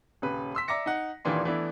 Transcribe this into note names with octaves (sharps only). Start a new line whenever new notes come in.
D#1 C#3 B4
C6 E6 B6
D5 E5 A#5 D6 A#6 C#7
D#4 F#5
D#1 A#2 D#3 E3 D4 C6
E3 A3 B3 D4 E4